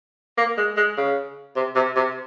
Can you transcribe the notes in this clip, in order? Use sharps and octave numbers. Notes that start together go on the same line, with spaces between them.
A#3
G#3
G#3
C#3
C3
C3
C3